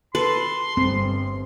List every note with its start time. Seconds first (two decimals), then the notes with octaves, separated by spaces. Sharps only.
0.15 A4 B4 C6
0.77 G1 C4